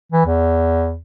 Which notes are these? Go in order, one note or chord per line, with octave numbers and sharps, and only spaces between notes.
E3
E2